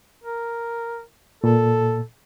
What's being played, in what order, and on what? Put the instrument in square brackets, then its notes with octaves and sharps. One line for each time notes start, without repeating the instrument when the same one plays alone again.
[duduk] A#4
[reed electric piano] A#2 [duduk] A4